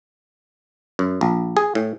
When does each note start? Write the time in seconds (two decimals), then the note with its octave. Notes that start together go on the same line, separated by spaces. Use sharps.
0.99 F#2
1.21 A#1
1.57 G#4
1.75 A2